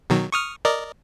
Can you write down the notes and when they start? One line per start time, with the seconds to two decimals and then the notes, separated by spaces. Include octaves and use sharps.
0.10 B2 D#3 F#3
0.32 C#6 D#6 F6
0.65 A#4 D5 D#5